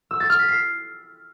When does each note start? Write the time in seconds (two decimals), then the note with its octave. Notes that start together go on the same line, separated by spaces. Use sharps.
0.11 E6
0.20 A6
0.30 F6
0.39 B6
0.48 C7